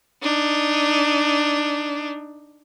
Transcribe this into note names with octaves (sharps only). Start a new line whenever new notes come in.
D4 D#4